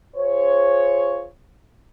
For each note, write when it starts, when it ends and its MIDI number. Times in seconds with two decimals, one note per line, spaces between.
0.15 1.25 65
0.15 1.25 68
0.15 1.25 72
0.15 1.25 73